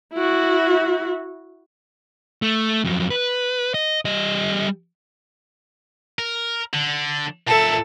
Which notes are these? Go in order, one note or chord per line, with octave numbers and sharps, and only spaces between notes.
E4 F#4
A3
F2 F#3
B4
D#5
G3 D#5
A#4
D3
A#2 A4 E5